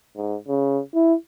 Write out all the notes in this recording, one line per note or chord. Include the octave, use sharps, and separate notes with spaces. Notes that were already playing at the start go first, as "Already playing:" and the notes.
G#2
C#3
E4